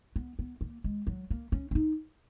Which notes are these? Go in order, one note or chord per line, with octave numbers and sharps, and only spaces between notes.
B3
B3
A#3
G#3
F#3
A#3
C#4
C#4
D#4